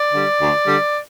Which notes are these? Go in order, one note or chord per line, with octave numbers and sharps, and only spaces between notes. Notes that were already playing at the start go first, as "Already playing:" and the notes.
Already playing: D5
D3 G3
D2
D3 G3